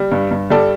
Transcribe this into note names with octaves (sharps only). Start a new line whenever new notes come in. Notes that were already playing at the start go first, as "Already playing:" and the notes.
Already playing: G3
G2
G2
G3 A4 D5